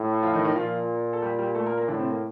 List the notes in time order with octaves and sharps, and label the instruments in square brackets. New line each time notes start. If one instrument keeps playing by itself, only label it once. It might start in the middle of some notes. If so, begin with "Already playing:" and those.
Already playing: [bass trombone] A2
[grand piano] F3 F4
D#3 D#4
D#3 D#4
[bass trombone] A#2 [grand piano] F3 F4
[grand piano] A4
G3 G4
G3 G4
A3 A4
A#3 A#4
A#3 A#4
[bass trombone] A2 [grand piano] D3 D4
[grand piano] C3 C4
A#3